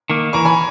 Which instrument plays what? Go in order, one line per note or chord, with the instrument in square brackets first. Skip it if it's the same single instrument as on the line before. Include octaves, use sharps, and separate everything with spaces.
[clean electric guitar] D#3 A#3
[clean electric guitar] E3 [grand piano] A#5 C#6
[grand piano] G#5 B5